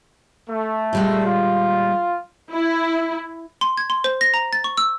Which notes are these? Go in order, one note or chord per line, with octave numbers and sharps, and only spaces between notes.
A3
A#2 G3 G#3
F4
E4
C6
G#6
C6
C5
A#6
A#5
A6
C#6
E6